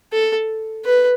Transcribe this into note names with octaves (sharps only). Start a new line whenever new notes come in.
A4
B4